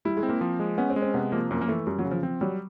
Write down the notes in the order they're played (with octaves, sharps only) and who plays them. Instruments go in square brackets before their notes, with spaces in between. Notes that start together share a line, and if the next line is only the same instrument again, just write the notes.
[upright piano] G3 [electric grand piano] E4
[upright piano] G#3
[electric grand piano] C4
[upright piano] A#3
[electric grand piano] F3
G#3
[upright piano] B3 [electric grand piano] C#4
[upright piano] C4
[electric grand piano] G#3
[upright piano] C4
[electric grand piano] C3 [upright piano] B3
[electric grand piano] F3 [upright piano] A#3
[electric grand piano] F#2 [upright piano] A#3
[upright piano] A#3
[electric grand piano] E3 [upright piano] A3
[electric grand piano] F#2 [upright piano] G3
[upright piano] F#3
[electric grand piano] C#3
[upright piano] F3
[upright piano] F3 [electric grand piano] C4
[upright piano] F#3 [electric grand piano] G3